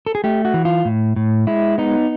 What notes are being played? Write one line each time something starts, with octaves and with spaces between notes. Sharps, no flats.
A4
G#4
A3 G4
F#4
E3
F4
A2
A2
G#3 E4
B3 D#4